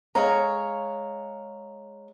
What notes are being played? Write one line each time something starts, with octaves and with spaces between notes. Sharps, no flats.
G#3 C#5 F5 A#5